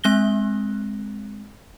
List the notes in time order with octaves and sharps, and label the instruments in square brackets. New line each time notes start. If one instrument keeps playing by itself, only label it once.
[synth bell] G#3 C4 F#6 A#6 G7